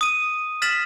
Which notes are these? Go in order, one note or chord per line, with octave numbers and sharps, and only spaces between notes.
D#6 D#7
F6 A6 B6 E7 F#7